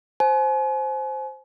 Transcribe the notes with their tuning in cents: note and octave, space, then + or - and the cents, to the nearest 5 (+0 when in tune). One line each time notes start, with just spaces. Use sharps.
C5 +0 G#5 +40